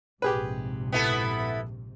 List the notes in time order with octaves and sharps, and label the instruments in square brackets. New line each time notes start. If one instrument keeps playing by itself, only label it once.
[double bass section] A#1 G#2 C3 [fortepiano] G4 G#4 B4
[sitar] B3 E4 A4